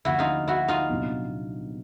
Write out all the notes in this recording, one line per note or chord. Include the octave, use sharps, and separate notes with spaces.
D2 D3 F3 A#3 E4 F#4
D#4 F4
E4 F#4
D#4 F4
C2 A#2 F#3 B3 D4